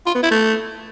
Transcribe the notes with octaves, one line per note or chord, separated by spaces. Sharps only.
F4
B3
E4
A3